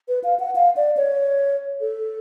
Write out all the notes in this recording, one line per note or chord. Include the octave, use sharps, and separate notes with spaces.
B4
F5
F#5
F5
D5
C#5
A4